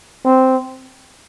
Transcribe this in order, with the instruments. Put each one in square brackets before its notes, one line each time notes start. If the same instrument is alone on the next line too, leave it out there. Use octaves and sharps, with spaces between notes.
[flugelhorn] C4